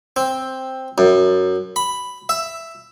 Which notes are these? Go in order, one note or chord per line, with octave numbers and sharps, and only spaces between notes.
C4
F#2
B5
E5